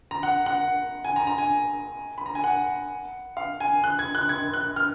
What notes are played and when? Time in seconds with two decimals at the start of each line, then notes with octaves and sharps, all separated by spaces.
0.11 A#5
0.23 F#5
0.46 F#5
1.05 G#5
1.16 A#5
1.27 A#5
1.38 G#5
2.18 B5
2.26 A#5
2.35 G#5
2.44 F#5
3.37 F5
3.60 G#5
3.84 F#6
3.99 G#6
4.15 F#6
4.29 G#6
4.54 F#6
4.76 F6